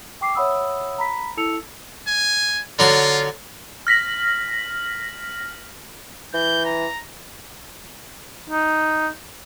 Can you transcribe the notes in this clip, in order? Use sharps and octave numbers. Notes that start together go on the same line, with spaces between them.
G5 C#6 D6 C7
C#5 E5 F#5 B5 D#6 E6
A#5 B5 B6
E4 A4 A5 E6 C#7 F7
G#5
D3 F#3 F4 C6
F6 A#6 B6 F#7
E3 G6
A#5
D#4